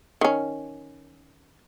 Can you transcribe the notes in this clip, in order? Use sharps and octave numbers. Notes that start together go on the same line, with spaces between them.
D#3 C#4